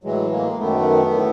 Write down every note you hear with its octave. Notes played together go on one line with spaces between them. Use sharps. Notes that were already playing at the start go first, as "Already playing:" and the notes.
A2 E3 F#3 G#3
G#3 A#3
F#2 D#3 A3 B3
A2 E3